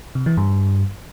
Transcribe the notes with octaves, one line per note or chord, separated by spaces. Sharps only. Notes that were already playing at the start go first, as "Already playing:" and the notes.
C3
E3
G2